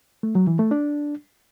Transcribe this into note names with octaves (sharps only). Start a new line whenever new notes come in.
A3
F#3
E3
A3
D4